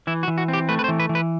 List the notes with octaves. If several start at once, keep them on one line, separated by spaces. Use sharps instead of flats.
E3 E4
F#4
E3
F#4
C4 G4
A3 B4
B4
C5
E3
B4
E3
B4